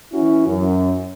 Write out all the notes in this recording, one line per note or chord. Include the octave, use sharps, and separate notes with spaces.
E3 C#4 E4 F#4
F#2